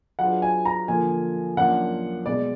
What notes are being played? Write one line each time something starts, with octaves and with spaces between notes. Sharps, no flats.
F#3 D4 F4 G#4 B4 F#5
G#5
A#5
D3 F3 A#3 G#5
F#2 F3 A#3 D4 F#5
B2 G#3 B3 D5